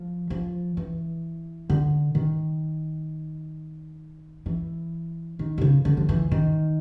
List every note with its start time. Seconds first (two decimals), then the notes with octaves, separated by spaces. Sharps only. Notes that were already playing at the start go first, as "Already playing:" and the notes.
Already playing: F3
0.30 F3
0.77 E3
1.70 D3
2.15 D#3
4.46 E3
5.39 D#3
5.58 C3
5.61 C#3
5.85 D3
5.97 F3
6.09 E3
6.32 D#3